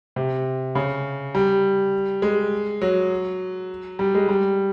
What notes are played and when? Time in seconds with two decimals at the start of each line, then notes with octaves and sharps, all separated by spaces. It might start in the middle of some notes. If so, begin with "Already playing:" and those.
0.16 C3
0.75 C#3
1.35 G3
2.22 G#3
2.82 F#3
3.99 G3
4.15 G#3
4.29 G3